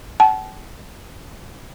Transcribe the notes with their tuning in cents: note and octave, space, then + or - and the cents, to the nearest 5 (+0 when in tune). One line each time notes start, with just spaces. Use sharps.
F#5 +45 A5 -35